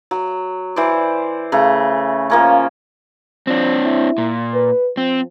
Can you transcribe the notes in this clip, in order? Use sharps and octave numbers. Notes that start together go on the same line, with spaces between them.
F#3
E3 C5 D5
C#3 A3 A#5
F3 A#3 C#4
F3 C4 D4
E4
A#2
B4
F3 C4